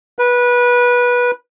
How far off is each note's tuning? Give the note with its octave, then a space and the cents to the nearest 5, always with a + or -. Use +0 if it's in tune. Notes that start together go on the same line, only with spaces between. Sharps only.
B4 -20